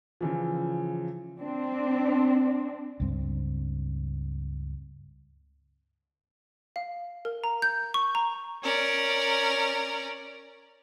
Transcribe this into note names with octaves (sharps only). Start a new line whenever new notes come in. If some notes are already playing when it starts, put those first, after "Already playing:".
C#3 E3 F3
C4 D4
C#2 G2 C4
F5
A#4
A#5
G6
C#6
A#5
C#4 A#4 D5